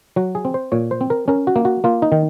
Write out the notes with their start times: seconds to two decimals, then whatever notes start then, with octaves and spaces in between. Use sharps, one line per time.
0.16 F#3 F#4
0.35 G#4
0.45 C4
0.54 C5
0.72 A#2 C#5
0.91 C5
1.01 C4
1.10 A#4
1.28 C#4 A#4
1.47 F#4
1.56 A#3
1.65 F#4
1.84 A#3 F4
2.02 D#4
2.12 D#3